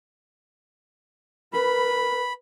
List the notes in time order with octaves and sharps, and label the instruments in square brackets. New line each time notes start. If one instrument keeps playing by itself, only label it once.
[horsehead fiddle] A#4 B4 [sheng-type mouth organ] B5